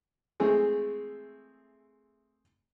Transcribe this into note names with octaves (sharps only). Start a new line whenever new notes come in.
E3 G#3 A3 C4 G#4